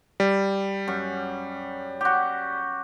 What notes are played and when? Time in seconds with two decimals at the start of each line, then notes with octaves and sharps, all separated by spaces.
0.20 G3
0.88 F#2
2.01 F#4 G4